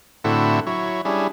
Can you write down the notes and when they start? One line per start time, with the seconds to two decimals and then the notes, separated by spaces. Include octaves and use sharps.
0.24 A2 D3 C4 E4 F#4 A4
0.67 F#3 E4 C#5
1.05 G3 C#4 D4 E4 G#4